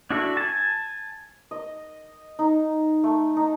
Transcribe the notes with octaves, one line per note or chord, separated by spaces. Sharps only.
D4 E4 F#4 A4
G#5 A5
D#5
D#4
A3
D#4